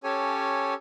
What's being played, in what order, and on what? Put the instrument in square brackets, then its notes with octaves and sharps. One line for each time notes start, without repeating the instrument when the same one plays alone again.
[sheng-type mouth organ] C#4 G4 A4 C#5 G#5